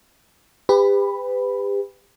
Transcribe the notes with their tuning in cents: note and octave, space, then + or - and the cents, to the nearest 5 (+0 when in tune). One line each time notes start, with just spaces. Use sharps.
G4 +35 B4 +30 B5 +0